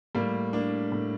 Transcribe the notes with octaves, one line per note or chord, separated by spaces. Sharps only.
A2 G3 A#3
A#3 D4
A2